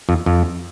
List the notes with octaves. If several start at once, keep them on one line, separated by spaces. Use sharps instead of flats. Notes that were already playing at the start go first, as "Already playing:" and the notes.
F2
F2